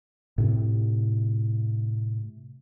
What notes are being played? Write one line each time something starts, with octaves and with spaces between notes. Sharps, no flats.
A2 C3